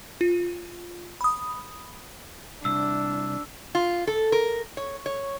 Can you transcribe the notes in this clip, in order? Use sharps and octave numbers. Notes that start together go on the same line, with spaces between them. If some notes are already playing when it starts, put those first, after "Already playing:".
F4
B5 D#6
C2 D4 E6
F4
A4
A#4
C#5
C#5